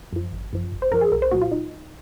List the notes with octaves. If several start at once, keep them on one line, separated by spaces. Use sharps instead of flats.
F#2 F3
G#1
F#2 F3
G#1
C5
F#2 F3 A#4
G#4
C2 A#4
C5
A#2 F#3 F#4
F4
D#4